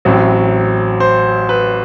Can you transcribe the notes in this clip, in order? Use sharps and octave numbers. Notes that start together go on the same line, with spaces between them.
A1 A2 F#3 C4
C5
B4